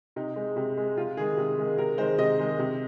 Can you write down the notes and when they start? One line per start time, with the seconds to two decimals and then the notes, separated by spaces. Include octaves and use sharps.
0.16 C3 D#4
0.36 G#3
0.56 C3
0.77 G#3
0.97 C3 F4
1.17 D#3 G#3 G#4
1.37 C3
1.58 D#3 G#3
1.78 C3 A#4
1.98 D#3 G#3 C5
2.18 C3 D#5
2.39 D#3 G#3
2.59 C3